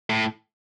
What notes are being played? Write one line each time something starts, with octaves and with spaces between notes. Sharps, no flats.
A2